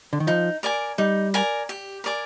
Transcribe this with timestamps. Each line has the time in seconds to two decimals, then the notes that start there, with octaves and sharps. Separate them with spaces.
0.13 D3
0.20 D#3
0.27 F3 D#4
0.63 A#4 D5 G#5
0.98 G3 D#4
1.34 A#4 D5 G#5
1.69 G4
2.04 A#4 D5 G#5